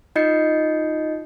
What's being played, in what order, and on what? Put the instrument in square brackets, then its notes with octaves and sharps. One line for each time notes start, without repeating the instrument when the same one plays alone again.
[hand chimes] D#4 F4 D#5 G6 C7 C#7